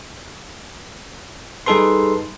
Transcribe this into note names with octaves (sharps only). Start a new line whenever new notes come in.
G3 D#4 G#4 A4 B4 C6